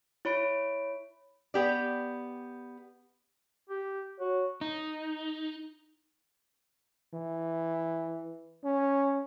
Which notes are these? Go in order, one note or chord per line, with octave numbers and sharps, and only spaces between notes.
E4 C#5 B5 D7
B3 G4 D5
G4
F#4 C#5
D#4
E3
C#4